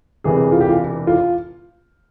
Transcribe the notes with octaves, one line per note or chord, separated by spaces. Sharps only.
E1 E2 C3 E3 G#4
F4
G4
F4
F4